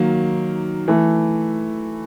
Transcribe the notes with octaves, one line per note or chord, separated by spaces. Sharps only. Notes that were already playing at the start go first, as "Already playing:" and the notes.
Already playing: D#3 F#3 A#3
E3 A3